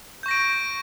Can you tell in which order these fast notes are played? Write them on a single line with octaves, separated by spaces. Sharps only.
G6 C#6 A#6 D7